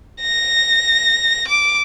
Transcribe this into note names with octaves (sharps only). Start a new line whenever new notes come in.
A#6
D6